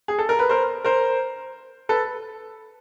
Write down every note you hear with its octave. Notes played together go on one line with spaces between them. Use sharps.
G#4
A4
A#4
B4
A#4 C5
A#4 C5
A4 B4